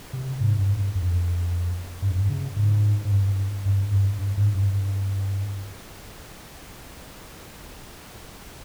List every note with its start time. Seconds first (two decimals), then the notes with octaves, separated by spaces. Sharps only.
0.13 C3
0.40 G#2
0.59 G2
0.76 G2
0.95 F2
2.02 G2
2.10 F2
2.17 G2
2.29 C#3
2.56 G#2
3.05 G#2
3.11 G2
3.65 G2
3.91 G2
4.19 G2
4.37 G#2
4.55 G2